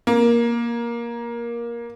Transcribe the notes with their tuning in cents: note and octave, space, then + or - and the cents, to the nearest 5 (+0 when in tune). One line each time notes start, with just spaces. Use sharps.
A#3 +15